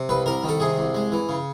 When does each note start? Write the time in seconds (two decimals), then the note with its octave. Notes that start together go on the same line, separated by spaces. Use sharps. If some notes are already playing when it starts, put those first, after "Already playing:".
Already playing: C3
0.09 C2 B4
0.26 C2 A#4
0.44 D#3 A4
0.60 C3 G#4
0.78 C2
0.95 G#3
1.12 E3
1.29 C#3